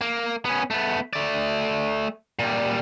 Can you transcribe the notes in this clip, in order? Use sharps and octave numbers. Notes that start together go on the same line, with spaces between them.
A#3
B3 C#4
A3 B3
A3 D5
A#2 G3